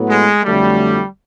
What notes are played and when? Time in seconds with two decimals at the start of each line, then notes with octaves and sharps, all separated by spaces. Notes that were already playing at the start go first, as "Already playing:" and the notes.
Already playing: A2 F#3 B3
0.09 G#3
0.43 F2 D3 F#3 G3 A3